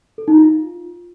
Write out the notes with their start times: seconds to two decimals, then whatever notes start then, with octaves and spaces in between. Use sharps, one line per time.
0.18 A4
0.28 D#4
0.37 F4